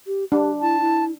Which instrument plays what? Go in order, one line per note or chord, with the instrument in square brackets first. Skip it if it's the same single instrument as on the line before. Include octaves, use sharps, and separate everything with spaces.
[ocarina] G4
[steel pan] D4 [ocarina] G4
[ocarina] E4 [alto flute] A5
[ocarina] E4